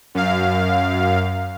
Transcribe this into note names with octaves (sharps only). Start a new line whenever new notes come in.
F#2 F5